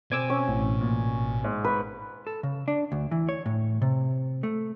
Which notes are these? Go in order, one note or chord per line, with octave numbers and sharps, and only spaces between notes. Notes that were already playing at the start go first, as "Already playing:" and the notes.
B2 C4 G#5 D6 E6
C#4
A1
A#2
G#2
B4 C#6
A4
C#3
D4
D2
E3
C#5
A2
C3
A3